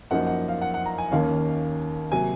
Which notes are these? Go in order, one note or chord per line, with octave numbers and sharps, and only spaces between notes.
F#2 F3 A#3 D#4 F#5
F#5
F5
F#5
F#5
A#5
G#5
D#2 D#3 A#3 C#4 F5
C3 F#3 A#3 G#5